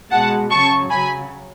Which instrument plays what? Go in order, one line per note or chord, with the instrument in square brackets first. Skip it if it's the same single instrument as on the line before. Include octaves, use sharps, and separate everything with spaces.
[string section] B2 G#3 F#5 A5
C#3 F#3 A5 C#6
C#3 F#3 G#5 B5